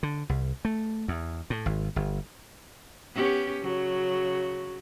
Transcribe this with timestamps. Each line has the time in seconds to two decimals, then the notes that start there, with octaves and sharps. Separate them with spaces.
0.03 D3
0.29 C2
0.65 A3
1.08 E2
1.50 A2
1.66 G#1
1.96 G1
3.15 B3 C#4 G4
3.62 C#3 F#3